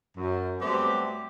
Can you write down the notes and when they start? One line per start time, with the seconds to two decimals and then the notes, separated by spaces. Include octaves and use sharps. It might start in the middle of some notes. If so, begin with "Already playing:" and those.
0.17 F#2
0.61 F#3 G3 A3 B3 C4 G4